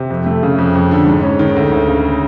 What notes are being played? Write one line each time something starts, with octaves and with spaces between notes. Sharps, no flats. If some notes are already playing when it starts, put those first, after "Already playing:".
Already playing: C3
F2
A3
C#3
F2
F2
D3
G#2
C#4
D#3
D2
D2
C#3